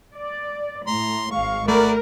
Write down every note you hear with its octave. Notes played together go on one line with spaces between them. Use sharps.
D5
A2 A#5 C6
G#1 G#3 F5 C#6
A3 F#4 A#4 D5 B5